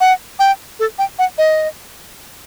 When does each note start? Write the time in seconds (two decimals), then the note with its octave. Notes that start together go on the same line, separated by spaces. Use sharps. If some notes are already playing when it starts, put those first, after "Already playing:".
0.01 F#5
0.39 G5
0.79 A4
0.98 G5
1.19 F#5
1.38 D#5